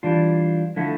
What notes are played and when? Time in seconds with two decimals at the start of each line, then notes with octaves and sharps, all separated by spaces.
0.03 E3 G3 D4 F4
0.76 D3 F3 A3 E4